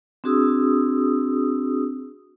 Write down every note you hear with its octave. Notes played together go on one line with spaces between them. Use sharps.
C4 D4 F#4 G#4 D#6 E6